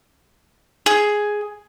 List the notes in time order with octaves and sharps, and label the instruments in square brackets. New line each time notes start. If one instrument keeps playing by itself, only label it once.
[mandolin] G#4